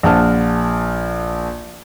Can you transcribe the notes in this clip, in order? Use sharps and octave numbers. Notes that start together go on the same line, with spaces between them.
A#1 F#5 A5 F6